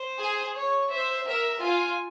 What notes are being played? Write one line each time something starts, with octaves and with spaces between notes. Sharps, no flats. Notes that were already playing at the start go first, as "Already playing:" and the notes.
Already playing: C5
G#4
C#5
C5 E5
A#4 E5
F4 G#5